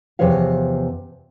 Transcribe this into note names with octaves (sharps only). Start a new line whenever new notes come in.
E2 C3 F3 B4 C#5 F5